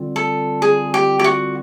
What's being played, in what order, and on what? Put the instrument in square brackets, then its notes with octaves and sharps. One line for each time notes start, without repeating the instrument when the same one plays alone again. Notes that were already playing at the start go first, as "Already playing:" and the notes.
Already playing: [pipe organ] D3 G3 C4 F4
[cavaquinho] A4
G#4
G4
G4
F#4